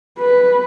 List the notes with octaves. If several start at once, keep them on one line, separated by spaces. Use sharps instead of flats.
B4